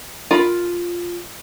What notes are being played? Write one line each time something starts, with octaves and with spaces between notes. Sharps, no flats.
F4 A#4 B5